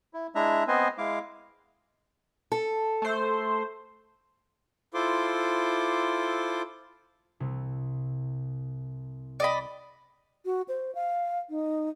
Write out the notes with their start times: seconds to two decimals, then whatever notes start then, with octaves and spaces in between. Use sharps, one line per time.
0.14 E4
0.35 G#3 D4 E4 E5 A#5
0.68 B3 C4 B4 C5 D#5 G#5
0.98 G#3 E4 F5 D6
2.52 A4
3.02 A3 C5
4.94 E4 F4 A4 C5 C6 D6
7.40 C2 C3 G3
9.40 D5 D#5 B5
10.45 F#4
10.68 C5
10.95 F5
11.50 D#4